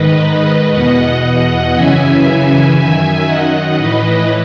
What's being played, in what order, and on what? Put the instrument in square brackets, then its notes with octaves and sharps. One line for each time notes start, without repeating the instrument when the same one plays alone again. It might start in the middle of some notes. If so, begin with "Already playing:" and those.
Already playing: [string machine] G#2 D#3 B4 D#5
E2 B2 D#5 F#5
F#2 C#3 E3 E5 G#5
F#2 D#3 E5 G#5
D#5 F#5
A2 E3 B4 D#5